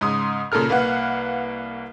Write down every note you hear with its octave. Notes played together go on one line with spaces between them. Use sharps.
G#2 C#3 C6 D#6
A#2 C#3 A4 A#4 F6
C2 A#3 B4 F5 F#5